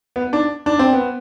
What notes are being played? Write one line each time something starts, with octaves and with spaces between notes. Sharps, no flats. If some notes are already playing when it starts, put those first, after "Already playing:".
B3
D4
D4
C4
B3